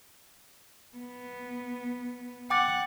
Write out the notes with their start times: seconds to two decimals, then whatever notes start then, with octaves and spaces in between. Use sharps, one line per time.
0.98 B3
2.50 F#5 G5 D6 A6